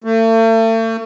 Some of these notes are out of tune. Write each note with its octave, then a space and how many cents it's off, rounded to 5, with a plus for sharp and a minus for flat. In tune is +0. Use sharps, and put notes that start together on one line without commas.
A3 +40